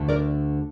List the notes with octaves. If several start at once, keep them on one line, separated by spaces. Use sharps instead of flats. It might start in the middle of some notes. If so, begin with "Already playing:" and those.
Already playing: D2 D3 A3
A#4 D5